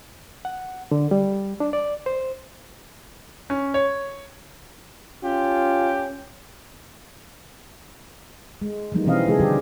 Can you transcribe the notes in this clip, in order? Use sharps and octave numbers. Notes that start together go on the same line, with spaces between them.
F#5
D3
G3
D4
D5
C5
C#4
C#5
C#4 F4 G4
G#3
E3 F3 G3 G#3 A#3 D#4
B2 E3 C4 C#4 D#5 F5
C#3 F3 G#3 G#4 A4 D#5
D3 G3 G4 A4